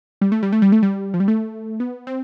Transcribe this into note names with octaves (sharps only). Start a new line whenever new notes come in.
G3
A3
G3
A3
G3
A3
G3
F3
G3
A3
B3
C4